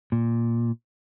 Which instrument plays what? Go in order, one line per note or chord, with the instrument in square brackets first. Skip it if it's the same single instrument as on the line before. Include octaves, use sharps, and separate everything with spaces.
[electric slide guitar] A#2